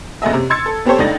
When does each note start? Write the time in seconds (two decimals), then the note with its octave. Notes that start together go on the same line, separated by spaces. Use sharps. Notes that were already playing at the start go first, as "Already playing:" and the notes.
0.22 F#2 C#3 A3 G#4 D#5 E5
0.33 C3
0.50 C6 E6 G#6 A6 C#7
0.66 A4
0.85 B3 C4 G4 A4 C5 C#5
0.99 C#2 A3 D4 D#4 A6 A#6